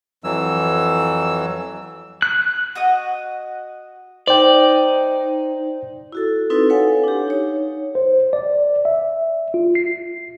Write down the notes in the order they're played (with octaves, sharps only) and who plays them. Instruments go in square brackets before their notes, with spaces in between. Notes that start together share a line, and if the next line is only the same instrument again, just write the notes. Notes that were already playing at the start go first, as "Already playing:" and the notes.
[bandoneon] F2 E3 F#3 E6
[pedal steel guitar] F#6
[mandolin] F#4 D#5 D#6
[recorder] D#4 [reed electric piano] C5 G5 [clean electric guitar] D5
[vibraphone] E4 F#4 A4
C4 D#4 E4 A4 B4
A4 B4 C#5 F5 F#5 G#5
D4 G4
D#4 C#5
[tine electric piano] C5
D5
E5
F4
C7